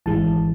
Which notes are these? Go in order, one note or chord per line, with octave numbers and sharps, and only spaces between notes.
G#1 G#2 E3 G#3 A5